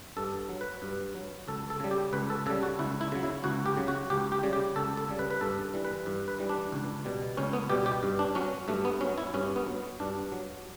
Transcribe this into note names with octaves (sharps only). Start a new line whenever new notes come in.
G2 A4
F#3
B4
G2
F#3
C#2 A4
A4
C#3 G3
G4
C#2 B4
A4
C#3 G3 A4
F#4
C#2 E4
E4
C#3 F#3
E4
C#2 F#4
G4
C#3 F#3
F#4
C#2 G4
G4
C#3 G3
G4
C#2 A4
A4
C#3 G3
B4
B4
G2 A4
E3 G3
B4
G2
B4
E3 G3
D4
C#2
B2 G3
C#2 C#4
B3
B2 G3 G4
G4
G2
D4
F#3 C#4
G2 A3
B3
F#3 C#4
E4
G2 C#4
B3
F#3
G2 D4
F#3